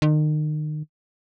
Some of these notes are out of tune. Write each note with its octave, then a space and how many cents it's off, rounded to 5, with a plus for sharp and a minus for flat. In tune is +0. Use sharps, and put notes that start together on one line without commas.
D#3 -35